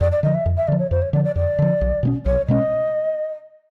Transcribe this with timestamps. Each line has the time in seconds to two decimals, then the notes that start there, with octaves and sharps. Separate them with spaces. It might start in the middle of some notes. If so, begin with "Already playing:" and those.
0.01 F2 D5
0.12 D5
0.23 D3 D#5
0.26 F3
0.34 E5
0.46 F2
0.57 E5
0.68 D3 F3 D5
0.79 C#5
0.91 F2 C5
1.02 C#5
1.13 D3 F3 D5
1.24 D5
1.36 F2 D5
1.59 D3 F3
1.81 B1
2.03 B2 G#3 C#4
2.26 B1 C#5
2.48 B2 G#3 C#4 D#5